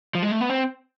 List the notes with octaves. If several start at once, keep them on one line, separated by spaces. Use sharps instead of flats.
F3
G#3
A3
B3
C4